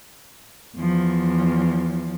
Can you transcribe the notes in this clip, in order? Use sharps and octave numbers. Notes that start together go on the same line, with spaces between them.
E2 F3